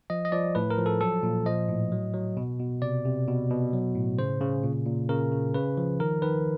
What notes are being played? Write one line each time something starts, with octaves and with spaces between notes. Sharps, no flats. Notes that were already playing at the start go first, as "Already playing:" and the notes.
F3 D#5
D#5
F3 D5
A2 B4
A#4
F3
A4
F#3 A4
A#2
F3 D#5
A2
F#3
F#3
B2
B2
C3 D5
C3
B2
B2
F#3
A2
C#3 C5
C#3
A#2
A#2
C#3 A#4
C#3
C#3 B4
F3
D#3 A#4
D#3 B4